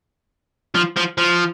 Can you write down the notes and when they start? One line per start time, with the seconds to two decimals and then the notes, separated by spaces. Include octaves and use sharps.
0.75 F3
0.97 F3
1.18 F3